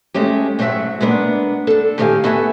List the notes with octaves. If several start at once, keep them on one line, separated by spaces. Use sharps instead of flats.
G#3 A3 C#4 G4
G#2 F#3 A3 B3 E5 F#5
G#3 A#3 B3 D4
D4 A4
A2 D#3 G4 D5 F5 G#5
B3 F#4 A4 E5 F#5 G#5